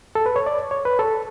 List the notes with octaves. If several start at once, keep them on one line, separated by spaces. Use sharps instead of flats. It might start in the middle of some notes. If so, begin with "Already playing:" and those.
A4
B4
C#5
D5
C#5
B4
A4